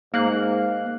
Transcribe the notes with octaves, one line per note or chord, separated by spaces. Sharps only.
G#2 A#3 F5 F#6